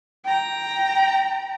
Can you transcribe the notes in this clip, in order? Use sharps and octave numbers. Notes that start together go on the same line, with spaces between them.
G5 A#5